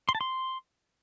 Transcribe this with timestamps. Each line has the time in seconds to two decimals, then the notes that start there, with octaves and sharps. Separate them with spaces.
0.09 C6
0.15 A5
0.21 C6